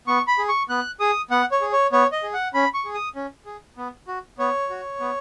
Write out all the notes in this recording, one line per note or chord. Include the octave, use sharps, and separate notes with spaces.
B3 C#6
B5
G#4
C#6
B3 F#6
G#4 D#6
B3 F#5
C#5
G#4
C#5
B3 C#5
D#5
G#4
F#5
C#4 B5
C#6
G#4
D#6
C#4
G#4
B3
F#4
B3 C#5
F#4
B3